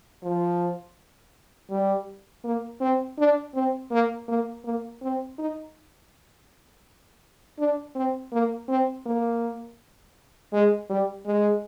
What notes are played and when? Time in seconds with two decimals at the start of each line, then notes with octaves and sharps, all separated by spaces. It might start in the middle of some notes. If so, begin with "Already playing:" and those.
0.23 F3
1.71 G3
2.44 A#3
2.81 C4
3.18 D4
3.54 C4
3.91 A#3
4.28 A#3
4.65 A#3
5.02 C4
5.38 D#4
7.59 D4
7.95 C4
8.32 A#3
8.68 C4
9.06 A#3
10.53 G#3
10.90 G3
11.26 G#3